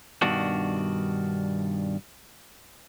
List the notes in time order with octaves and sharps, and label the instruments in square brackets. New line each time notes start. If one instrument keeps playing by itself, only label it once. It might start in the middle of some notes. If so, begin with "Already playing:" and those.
[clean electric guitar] G2 B2 D#3 D4 F#4